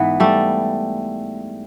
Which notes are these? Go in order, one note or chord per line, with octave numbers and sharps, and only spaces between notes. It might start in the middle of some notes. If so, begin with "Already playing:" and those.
Already playing: G#2 E3 B3
G3 A3